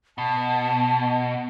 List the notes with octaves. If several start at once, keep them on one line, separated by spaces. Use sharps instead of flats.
B2 A5